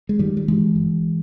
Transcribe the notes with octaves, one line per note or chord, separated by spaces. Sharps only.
G#3
G1 D#3 G3
G3
G2 E3 G#3
G1